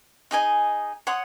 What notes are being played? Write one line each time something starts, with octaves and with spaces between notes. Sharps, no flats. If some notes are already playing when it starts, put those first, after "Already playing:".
D#4 G#4 D#5 G#5
C#5 F#5 C6 D#6